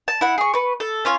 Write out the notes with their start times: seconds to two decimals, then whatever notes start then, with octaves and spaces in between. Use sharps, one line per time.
0.08 A5
0.21 E4 F#5
0.38 G#4 C#6
0.54 B4 C#6
0.80 A4
1.05 C#4 F4 C#5